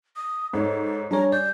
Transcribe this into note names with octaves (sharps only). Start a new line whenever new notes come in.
D#6
G#2 A4 C#5
G3 D4 G#4 C#5 A#5
D5 G6